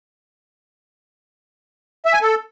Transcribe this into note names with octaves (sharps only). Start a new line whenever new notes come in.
E5
G#5
A4